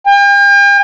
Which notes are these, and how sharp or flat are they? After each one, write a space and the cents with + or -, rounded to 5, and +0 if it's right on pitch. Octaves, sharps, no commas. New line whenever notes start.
G5 +45